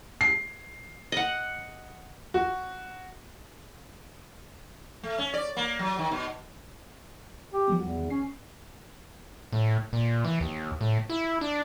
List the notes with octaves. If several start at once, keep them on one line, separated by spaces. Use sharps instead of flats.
C7
D#5 F#5
F#4
A3
C#4
D5
A#3
F#3
D#3
B2
G4
F3 G3 B3
E2 F#4
D#3
C#4 C7
A2
A#2
E3
D#2
A2
E4
D4